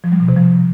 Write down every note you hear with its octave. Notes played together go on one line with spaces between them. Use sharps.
F3
G3
B2
C3
F3